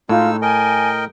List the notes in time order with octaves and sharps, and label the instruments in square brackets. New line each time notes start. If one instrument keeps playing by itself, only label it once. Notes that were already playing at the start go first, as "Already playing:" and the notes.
[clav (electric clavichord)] A2 [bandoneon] G#3 D#4 E6 [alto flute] F4
[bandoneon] A#4 D#5 G5 [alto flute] G#5